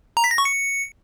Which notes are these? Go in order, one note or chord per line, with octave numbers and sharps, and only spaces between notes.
A#5
B6
A#6
C#6
C#7